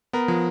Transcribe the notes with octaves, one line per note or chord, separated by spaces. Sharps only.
B3 A#4
F3